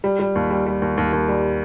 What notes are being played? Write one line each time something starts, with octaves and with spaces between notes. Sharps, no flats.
G3
G3
D#2
G3
G3
D#2
D#2
D#2
G3